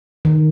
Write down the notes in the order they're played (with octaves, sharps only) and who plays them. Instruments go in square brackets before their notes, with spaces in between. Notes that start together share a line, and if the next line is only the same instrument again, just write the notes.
[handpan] D#3